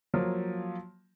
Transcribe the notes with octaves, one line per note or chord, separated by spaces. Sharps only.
F3 F#3 A#3